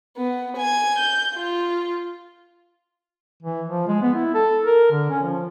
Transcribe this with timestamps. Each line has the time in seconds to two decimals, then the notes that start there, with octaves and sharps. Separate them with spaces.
0.17 B3
0.57 G#5 G#6
0.99 G6
1.35 F4
3.43 E3
3.68 F3
3.88 G#3
4.02 B3
4.14 E4
4.34 A4
4.66 A#4
4.91 D3
5.10 C#4
5.23 F3